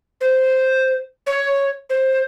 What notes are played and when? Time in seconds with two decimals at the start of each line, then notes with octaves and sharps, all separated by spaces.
0.21 C5
1.27 C#5
1.90 C5